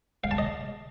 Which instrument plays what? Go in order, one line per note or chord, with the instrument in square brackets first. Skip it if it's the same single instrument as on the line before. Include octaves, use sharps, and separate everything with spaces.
[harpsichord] F5
A5
D#5